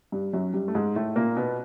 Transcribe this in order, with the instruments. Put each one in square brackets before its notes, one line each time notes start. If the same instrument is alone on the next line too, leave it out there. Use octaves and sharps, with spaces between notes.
[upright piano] G2 G3
F#2 F#3
G2 G3
A3
G#2 G#3
A2 A3
A#2 A#3
B2 B3